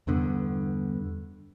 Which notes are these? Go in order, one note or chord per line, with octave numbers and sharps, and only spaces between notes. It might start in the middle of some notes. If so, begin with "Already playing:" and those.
E2 G2 D3 B3